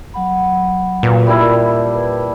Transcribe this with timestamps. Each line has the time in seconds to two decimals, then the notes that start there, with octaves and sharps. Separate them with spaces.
0.14 F#3 F#5 B5
1.03 A#2 F#4 B4
1.26 G3 D4 E4 A#4 E5
1.93 A#4 B4